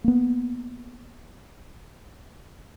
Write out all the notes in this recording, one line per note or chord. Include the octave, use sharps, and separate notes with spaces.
A#3 B3